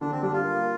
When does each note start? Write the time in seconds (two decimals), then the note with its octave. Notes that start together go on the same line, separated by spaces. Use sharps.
0.01 D3 D4
0.12 C4
0.22 G3 D4
0.33 F4
0.44 A#3